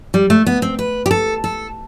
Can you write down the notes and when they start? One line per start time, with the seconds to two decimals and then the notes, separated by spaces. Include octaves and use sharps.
0.14 G3
0.30 A3
0.47 B3
0.62 C4
0.79 B4
1.06 G4
1.11 A4
1.44 A4